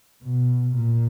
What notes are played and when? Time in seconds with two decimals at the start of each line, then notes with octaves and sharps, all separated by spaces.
0.23 B2
0.76 A#2